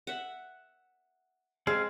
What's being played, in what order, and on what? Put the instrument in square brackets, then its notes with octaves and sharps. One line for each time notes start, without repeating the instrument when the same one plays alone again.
[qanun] E5 F#5
[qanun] G#3 [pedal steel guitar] C4 G#4 F5